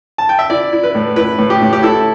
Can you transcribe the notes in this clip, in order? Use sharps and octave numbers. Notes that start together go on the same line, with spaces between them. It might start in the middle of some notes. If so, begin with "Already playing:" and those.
A5
G5
E5
E4 D5
E4
B4
A2
E4 B4
A2
G4
A2
G4
E4 A4